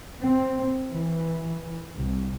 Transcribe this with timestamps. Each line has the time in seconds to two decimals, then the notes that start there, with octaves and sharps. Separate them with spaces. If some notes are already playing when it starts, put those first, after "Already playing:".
0.22 C4
0.91 E3
1.95 C2